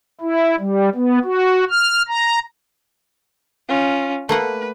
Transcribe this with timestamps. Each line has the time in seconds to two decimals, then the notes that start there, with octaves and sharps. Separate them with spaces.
0.21 E4
0.59 G3
0.95 B3
1.25 F#4
1.70 F6
2.08 A#5
3.68 C#4 F4
4.29 A3 A#3 B4 F#5